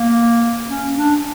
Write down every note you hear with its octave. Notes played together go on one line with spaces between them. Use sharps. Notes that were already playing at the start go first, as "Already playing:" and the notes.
Already playing: A#3
C#4
D4